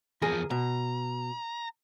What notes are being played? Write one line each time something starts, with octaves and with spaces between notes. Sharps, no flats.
E2 F3 G#4 A#4
B2 A#5